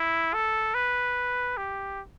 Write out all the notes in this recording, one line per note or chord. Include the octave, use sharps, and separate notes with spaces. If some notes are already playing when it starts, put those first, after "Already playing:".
Already playing: E4
A4
B4
G4